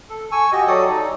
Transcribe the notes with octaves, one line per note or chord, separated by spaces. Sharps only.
A4
G#5 C#6 E6
F#4 G4 D#5
F#3 A4 D5 D#6
D#4